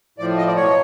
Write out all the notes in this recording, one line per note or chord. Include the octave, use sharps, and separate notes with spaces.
A2 F3 D5
D#5
D5
B2 F#3 C#5